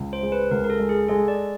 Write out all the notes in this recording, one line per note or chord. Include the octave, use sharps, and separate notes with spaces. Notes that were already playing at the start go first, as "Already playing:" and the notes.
Already playing: C#2
C5
G#3
B4
C#2 A#4
A#4
A4
G#3
G#4
G#3 A4
D5